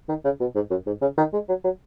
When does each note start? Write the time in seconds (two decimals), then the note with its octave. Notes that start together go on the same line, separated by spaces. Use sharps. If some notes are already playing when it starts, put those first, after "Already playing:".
0.09 D#3
0.24 C#3
0.40 B2
0.55 G#2
0.70 F#2
0.86 G#2
1.01 C#3
1.17 D#3
1.33 G#3
1.48 F#3
1.64 F#3